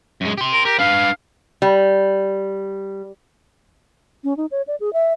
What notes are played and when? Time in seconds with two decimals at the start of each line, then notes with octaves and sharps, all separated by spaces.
0.21 F#2 G#3
0.38 G4 C6
0.53 A#4
0.65 G4 A#4
0.79 D4 B4 F5
1.62 G3
4.24 C#4
4.37 D#4
4.51 C#5
4.67 D5
4.80 G#4
4.93 E5